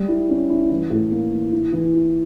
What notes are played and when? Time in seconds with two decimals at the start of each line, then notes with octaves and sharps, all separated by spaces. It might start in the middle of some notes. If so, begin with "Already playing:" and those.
Already playing: G3
0.08 E4
0.29 C#4
0.50 E4
0.70 E3
0.90 A2
1.11 A#3
1.32 E3
1.52 E4
1.72 E3
1.93 E4